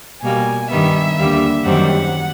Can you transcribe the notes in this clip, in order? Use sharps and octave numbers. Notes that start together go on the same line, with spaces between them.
B2 G3 A#3 G#5
G2 D#3 G3 B3 E5
D#2 D3 G3 A#3
F#2 D#3 G3 C4 F#5